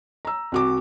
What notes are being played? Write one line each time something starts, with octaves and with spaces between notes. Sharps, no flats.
A#5 E6
C2 F#4 D6